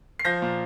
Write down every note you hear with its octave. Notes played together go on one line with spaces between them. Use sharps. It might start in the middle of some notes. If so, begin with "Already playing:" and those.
C7
F3 G6 A#6
A#2